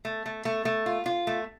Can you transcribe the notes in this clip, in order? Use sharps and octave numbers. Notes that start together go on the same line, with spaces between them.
A3
A3
A3
A3
F4
F4
A3